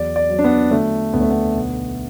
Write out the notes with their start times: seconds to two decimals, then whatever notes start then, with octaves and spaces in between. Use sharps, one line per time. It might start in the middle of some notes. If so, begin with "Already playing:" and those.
Already playing: E2 F#3 D5
0.16 D5
0.30 F#3
0.39 D4
0.44 B3
0.71 D3 A3
1.13 D2 B3
1.21 A3
1.30 B3
1.55 B1